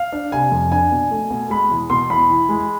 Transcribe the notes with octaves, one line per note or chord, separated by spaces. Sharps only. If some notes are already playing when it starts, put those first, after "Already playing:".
Already playing: F5
D4
C3 G#5
F2
D4 G#5
B2
A3
B2
G#3 B5
E2
B2 C6
E2 B5
E3
G#3